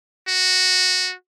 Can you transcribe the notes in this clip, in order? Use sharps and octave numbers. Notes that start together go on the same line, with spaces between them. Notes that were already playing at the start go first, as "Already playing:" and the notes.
F#4